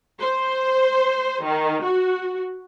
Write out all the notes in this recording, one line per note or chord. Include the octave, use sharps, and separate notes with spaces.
C5
D#3
F#4